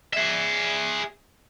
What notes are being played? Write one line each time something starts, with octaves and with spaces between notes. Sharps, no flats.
G#4 E5